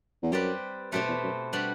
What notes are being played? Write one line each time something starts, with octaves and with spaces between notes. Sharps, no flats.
E2
F#2 G3 C4 G4 B4 D5
F#2 B2 A3 C4 G4 B4
E2
F#2
G3 D4 F#4 B4